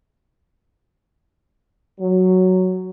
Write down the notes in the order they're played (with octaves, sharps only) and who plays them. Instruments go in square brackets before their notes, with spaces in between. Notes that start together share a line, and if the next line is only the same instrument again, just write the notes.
[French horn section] F#3